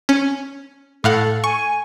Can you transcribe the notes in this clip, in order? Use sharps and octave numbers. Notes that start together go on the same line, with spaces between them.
C#4
A2 A4 F5 F#5
G#5 C#6